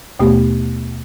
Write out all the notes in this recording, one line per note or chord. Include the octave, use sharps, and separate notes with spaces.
D#2 B2 A3 B3 G4